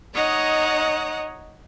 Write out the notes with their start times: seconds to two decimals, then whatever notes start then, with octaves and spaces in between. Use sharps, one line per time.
0.14 D#4 C#5 D#5 F#5 A#5 D#6